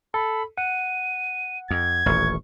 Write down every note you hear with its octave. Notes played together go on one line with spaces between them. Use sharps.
A4 B5
F#5 D#7
F2 G#6
D#1 A1 C#6